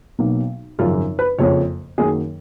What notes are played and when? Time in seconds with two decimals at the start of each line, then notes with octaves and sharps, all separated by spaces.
0.18 B1 B2 F#3 A#3
0.79 G#1 F#2 C#3 F3 F4
1.19 B4
1.38 F#1 F2 C#3 F3 A#3 C#5
1.98 F#2 D#3 F#3 A#3 G#4